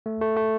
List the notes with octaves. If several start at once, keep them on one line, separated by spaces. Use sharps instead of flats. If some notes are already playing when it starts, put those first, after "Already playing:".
A3
A3
A3